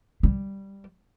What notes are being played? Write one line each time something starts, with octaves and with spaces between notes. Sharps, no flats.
G3